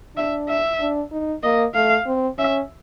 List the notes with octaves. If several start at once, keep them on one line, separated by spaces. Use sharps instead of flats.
D4 E5
E5
D4
D#4
A#3 D#5
A3 F5
C4
C#4 E5